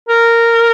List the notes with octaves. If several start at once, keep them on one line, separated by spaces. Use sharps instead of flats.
A#4